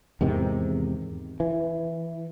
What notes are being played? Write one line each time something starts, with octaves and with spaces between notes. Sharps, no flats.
E2 G#2 C3 D#3
E3